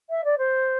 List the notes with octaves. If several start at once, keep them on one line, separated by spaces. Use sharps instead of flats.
E5
D5
C5